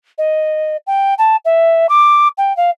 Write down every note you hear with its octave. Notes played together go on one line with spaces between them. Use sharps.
D#5
G5
A5
E5
D6
G5
F5